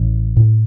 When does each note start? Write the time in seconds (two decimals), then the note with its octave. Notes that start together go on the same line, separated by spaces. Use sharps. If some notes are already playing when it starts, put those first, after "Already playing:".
Already playing: A1
0.37 A2